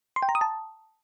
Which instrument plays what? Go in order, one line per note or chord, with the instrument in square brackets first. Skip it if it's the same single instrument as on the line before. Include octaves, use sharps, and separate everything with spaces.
[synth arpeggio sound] C6
G5
A#5
D#6
A5